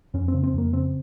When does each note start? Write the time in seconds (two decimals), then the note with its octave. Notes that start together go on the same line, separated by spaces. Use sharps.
0.14 F2 C#4
0.28 C4
0.34 C#3
0.43 C4
0.54 F2 A#3
0.73 C#3 C4